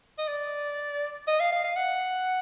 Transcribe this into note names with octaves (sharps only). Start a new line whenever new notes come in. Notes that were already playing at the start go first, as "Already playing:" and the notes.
D#5
D5
D#5
F5
F5
F5
F#5